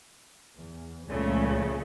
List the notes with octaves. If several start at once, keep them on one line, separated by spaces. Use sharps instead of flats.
E2
C#2 A#2 C#3 F3 A3